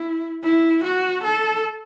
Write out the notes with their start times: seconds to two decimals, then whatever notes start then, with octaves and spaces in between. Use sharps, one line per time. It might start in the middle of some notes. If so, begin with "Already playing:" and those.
Already playing: E4
0.43 E4
0.84 F#4
1.24 A4